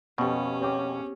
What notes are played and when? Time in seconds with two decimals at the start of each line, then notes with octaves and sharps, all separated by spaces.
0.18 F2 B2 B3 C#4 G4 B4
0.61 C4 G4 G#4 C#5 G5 D6